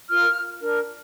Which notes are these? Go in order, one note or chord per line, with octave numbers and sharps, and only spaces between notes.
F4 A#4 F6
D4 A#4